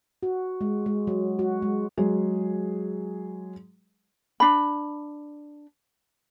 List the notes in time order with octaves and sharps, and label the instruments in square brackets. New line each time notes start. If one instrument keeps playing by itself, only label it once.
[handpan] F#4
G#3
G#3
F#3
F#4
G#3
[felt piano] F#3 G#3 G#4
[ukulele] D4 B5